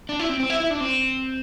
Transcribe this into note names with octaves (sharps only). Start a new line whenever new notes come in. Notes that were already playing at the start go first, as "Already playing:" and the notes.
D4
E4
C4
C4
E4
E4
D4
C4